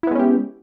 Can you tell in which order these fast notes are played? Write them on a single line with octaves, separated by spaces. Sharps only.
E4 B3 G#3 C#4 G4